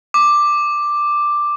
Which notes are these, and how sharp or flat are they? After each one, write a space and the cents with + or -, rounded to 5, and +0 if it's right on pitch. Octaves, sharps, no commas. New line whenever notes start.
D6 +5